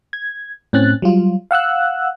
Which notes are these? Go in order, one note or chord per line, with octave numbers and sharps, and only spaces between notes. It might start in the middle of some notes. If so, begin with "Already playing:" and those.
G#6
A2 C4 C#4 F#6 A6
F#3 G3 F4
F5 F#5 E6 F#6